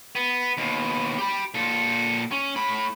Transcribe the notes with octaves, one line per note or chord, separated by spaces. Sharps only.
B3
D#2 B2
G4 B5
A#2 A4
C#4
A2 B5